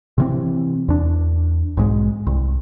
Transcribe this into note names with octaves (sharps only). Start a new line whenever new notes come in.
C3 E3 C4
E2 D4
B1 G#2 G3 G#3
C2